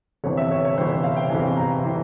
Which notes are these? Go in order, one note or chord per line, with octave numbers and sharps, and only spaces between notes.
G1 F2 C3 E3 C#5
E5
C#5
C#5
G1 F2 C3 E3 C5
C#5
F5
G5
G1 F2 C3 E3 G#5
A#5
C3 E3